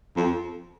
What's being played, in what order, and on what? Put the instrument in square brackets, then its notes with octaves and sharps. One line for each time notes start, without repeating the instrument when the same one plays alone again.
[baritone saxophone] F2